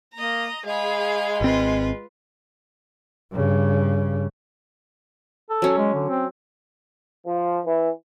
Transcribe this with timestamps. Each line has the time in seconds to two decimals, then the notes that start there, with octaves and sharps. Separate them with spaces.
0.14 A#3 D#5 A#5
0.66 G#3 G#4 F5 B5
1.41 G#1 C4 F4 B4
3.32 G2 C#3
5.50 A4
5.62 F#3 C#4
5.78 G#3
5.94 D3
6.09 C4
7.26 F3
7.66 E3